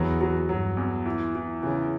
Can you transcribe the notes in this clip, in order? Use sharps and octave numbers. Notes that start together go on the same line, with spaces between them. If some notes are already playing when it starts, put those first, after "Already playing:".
Already playing: E2 F#3 B3 F#4
F#3
G2 F#3
E2
E3
E3
C#3 E3